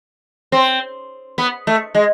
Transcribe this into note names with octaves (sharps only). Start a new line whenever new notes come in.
C4
B3
A3
G#3